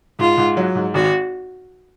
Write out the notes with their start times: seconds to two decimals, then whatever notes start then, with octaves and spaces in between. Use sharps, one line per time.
0.19 G#2 F4
0.38 G#2
0.57 F#3
0.75 G#2
0.94 G#1 F#4